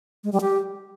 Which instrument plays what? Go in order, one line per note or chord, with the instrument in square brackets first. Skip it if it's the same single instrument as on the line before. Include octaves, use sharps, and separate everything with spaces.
[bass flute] G#3
G3
G4